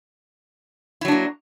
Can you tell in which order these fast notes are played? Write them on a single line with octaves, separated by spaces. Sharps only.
E4 F#3 D4 A#3